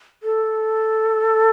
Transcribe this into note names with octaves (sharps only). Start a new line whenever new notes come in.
A4